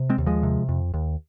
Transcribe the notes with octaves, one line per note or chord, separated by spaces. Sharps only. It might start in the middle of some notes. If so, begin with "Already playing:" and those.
Already playing: C3
G#3 C4
D#2
F3 G#3
C3
F2
D#2